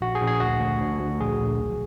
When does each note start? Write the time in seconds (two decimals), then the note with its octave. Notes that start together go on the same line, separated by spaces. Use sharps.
0.01 A#1 F#4
0.15 G#4
0.21 A#1
0.27 G#4
0.40 D2 F#4
0.60 D2
0.81 D2
0.99 D2
1.20 A#1 G#4
1.40 A#1
1.59 B1